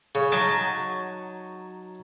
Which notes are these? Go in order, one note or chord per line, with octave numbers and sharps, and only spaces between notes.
C#3
F#3 D#4 F#4 A5